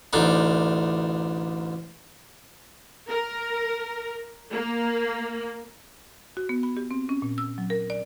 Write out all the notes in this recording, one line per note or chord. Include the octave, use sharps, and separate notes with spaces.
A1 D2 D4 D#4
A#4
A#3
F#4
B3
B5
G4
C4
C#4
A#2
E6
F#3
A#4
D5